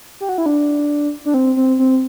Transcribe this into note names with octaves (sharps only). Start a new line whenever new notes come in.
G4
F#4
E4
D4
D4
C4
C4
C4